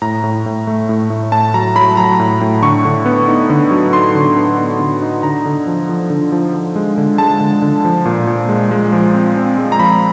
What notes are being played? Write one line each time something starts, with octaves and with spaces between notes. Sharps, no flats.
A2 A#5
A2
A2
A3
A2
A2
A2 A5
F#3 A#5
F#3 B5
F#3 A#5
A2
A2
D3 C#6
D3
B3
D#4
D3
F#3
D#4 C6
D3
B3
D#4
D3
D#4
D3 A#5
D3
F3
F3
D3
F3
F3
G#3
D3
G#3 A5
D3
D3
F3
A#2
A#2
G#3
G#3
F3
C4
C4
G#3
A#5
F3 B5